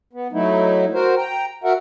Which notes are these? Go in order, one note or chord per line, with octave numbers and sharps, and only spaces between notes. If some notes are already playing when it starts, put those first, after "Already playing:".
B3
F#3 A3 D#4 E4
F#4 A#4 C5
G5 A#5
F#4 A#4 E5 F#5